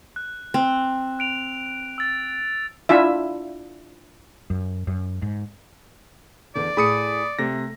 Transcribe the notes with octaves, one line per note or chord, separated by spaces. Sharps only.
F#6
C4
F#6 D7 F7
E6 A6
D4 E4 F4 E5
F#2
F#2
G#2
E2 D3 E3 D5
A2 G#4 B5 D#6 C#7
C3 A3 A#6